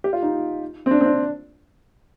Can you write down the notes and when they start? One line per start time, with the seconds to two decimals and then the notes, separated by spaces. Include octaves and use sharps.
0.04 G4
0.13 F4
0.23 D#4
0.86 C4
0.91 D4
1.01 C4
1.06 D4